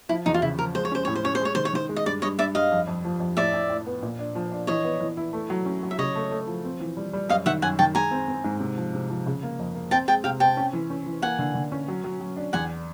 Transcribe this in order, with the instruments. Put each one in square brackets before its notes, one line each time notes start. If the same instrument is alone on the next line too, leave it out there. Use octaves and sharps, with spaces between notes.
[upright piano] F3 [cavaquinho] E4
[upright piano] E2 [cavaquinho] D#4
[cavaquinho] F4
[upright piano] C#3 [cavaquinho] E4
[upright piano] F3 [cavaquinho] A#4
[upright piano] G#3 [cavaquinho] C5
[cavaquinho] C#5
[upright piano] C#4 [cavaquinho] C5
[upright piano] A2 [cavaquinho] C#5
[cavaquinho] C5
[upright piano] C#4 [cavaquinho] C#5
[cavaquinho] C5
[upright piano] G#3 [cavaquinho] C#5
[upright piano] D#3 [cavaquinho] C5
[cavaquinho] C#5
[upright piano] D#3 [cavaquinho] C5
[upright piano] G#3
[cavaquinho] D#5
[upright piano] G2 [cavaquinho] D5
[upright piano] G2 [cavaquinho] C#5 D#5
[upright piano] G2 [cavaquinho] D5 E5
[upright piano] G2 [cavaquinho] D#5 F5
[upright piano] F2
F2
F3
F2
[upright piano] A2 [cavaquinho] D5 E5
[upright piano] A2
A2
B3
A#2
D4
F3
D4
[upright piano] E3 [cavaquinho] C#5 D#5
[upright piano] B3
E3
E4
A3
F#3
C#4
F#3
[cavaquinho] E5
[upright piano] C#3 [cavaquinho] C#5 D#5
[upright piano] A3
A3
F3
C4
E3
G3
G3
[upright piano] F#2 [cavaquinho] D#5 F5
[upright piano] D#3 [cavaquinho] E5 F#5
[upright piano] F#2 [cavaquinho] F#5 G#5
[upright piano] D#3 [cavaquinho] G5 A5
[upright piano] G#3 [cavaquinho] G#5 A#5
[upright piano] C4
C4
G#2
C3
F3
C3
F3
C#3
A#3
F2
A#3
[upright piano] C4 [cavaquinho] G5 A5
[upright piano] G#3 [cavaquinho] G5 A5
[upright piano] C3 [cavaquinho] F5 G5
[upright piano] C4 [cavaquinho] G5 A5
[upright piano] C#4
E3
C#4
E3
[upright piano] A#3 [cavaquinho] F#5 G#5
[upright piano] D3
D3
C#4
F#3
F#3
F#3
D4
[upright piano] E2 [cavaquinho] F#5 G#5